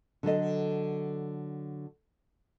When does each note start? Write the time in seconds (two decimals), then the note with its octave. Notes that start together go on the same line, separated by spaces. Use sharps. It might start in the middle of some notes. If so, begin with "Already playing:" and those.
0.23 D3 F#3 A4 D#5